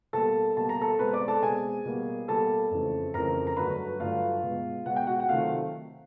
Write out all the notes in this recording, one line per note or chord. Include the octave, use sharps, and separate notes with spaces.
B2 G3 A#3 A4 A5
B2 G3 A#3 A5
A#5
A4 A5
B2 G#3 C4 B4 B5
D5 D6
A4 A5
B2 G#3 C4 G#4 G#5
B2 G3 A#3
B2 G3 A#3 A4 A5
F2 C#3 E3 A3 C4
F2 C#3 E3 A3 C4 A#4 A#5
A#5
G2 D3 F#3 A3 B4 B5
G2 D3 F#3 A3 F4 F5
B2 G#3 B3
B2 G#3 B3 F#5
G5
F#4 F#5
F#5
C3 D#3 F#3 A3 C4 F4 F5